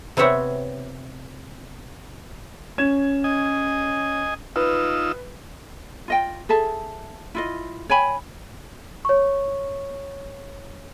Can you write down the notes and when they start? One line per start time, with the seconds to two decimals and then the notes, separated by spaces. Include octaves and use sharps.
0.17 C3 B3 C4 C#5 E5 F#5
2.78 C#4 G#6 E7
3.24 D#5 G#5
4.56 D#4 F4 B4 E6
6.08 F4 D#5 G5
6.49 G#4 A4 E5 A5
7.35 E4 F4 D#5
7.89 C#5 G5 G#5 B5
9.05 C#5 C#6